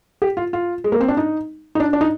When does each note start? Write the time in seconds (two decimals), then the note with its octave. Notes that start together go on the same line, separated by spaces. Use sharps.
0.22 G4
0.37 F4
0.53 F4
0.84 G#3
0.92 A#3
1.01 C4
1.08 D4
1.17 D#4
1.75 D#4
1.80 D4
1.93 D4
2.01 D#4